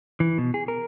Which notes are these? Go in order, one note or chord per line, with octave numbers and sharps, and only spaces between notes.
E3
B2
G#4
A#4